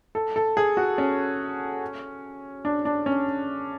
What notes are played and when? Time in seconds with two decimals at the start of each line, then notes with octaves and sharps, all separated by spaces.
0.15 A4
0.36 A4
0.57 G#4
0.77 F#4
0.98 C#4
2.65 D4
2.85 D4
3.06 C#4